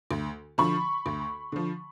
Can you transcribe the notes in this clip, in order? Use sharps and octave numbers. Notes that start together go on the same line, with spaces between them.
D2
D3 F3 B5 C#6
D2
D3 F3